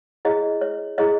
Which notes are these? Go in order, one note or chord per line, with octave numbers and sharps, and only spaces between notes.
E4 G#4 C#5 D#5
C#5
E4 G#4 C#5 D#5